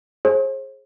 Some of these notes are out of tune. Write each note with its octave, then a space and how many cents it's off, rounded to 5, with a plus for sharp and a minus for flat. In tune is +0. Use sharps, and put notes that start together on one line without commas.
G#4 +20 C5 +40